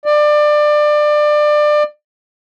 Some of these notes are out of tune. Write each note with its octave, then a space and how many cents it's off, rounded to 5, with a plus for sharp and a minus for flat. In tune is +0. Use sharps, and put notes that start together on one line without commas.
D5 +25